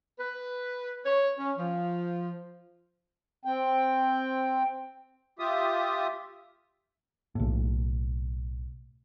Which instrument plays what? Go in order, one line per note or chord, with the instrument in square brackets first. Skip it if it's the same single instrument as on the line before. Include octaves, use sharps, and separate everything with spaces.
[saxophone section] B4
C#5
C#4
F3
[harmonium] C4 G5
[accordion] F4 G4 E5 D#6
[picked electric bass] B1 A2